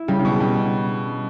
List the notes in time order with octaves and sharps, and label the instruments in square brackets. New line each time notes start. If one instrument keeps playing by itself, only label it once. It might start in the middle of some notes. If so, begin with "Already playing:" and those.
Already playing: [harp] E4
[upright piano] C#3 [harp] G3
[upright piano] C#3
B2
[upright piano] B2 [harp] G3